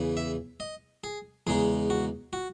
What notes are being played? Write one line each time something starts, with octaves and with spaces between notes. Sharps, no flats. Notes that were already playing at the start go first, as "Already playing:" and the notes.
Already playing: E2 C#3 E3
E5
D#5
G#4
E2 C#3 G#3 D#4 G#4
F#4
F#4